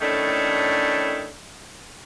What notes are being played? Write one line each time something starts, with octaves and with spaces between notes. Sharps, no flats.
A2 D#3 A3 C#4 D4